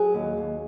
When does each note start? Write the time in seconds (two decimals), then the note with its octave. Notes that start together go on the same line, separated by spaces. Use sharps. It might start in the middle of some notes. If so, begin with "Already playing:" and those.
Already playing: F#3 G#4
0.14 D#2
0.37 D#2